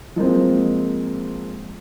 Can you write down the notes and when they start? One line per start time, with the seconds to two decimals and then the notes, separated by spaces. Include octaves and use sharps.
0.16 F3 G#3 A#3 C4